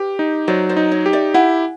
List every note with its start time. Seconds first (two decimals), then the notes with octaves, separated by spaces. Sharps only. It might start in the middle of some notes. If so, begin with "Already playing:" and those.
Already playing: G4 B4
0.19 D#4
0.48 F#3 C5 D5
0.69 C5 D5
0.77 D#4
0.91 C#5 D#5
1.06 G4
1.13 D5 E5
1.34 E4 F#5 G#5